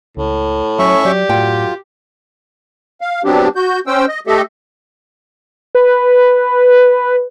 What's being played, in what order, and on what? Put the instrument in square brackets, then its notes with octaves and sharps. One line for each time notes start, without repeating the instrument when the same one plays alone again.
[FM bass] C#2 [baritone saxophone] A2
[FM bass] F#3 [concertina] C#4 E5 C#6
[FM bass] F#3 [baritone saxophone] G4 [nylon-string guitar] D5
[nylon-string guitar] F#2 G5 [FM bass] A2 [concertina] F4
[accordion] F5
F#3 B3 C4 D4 G4
F#4 G6
C#4 C5 G5 E6
D#5
A3 G4 A4 D#5 E5
[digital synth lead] B4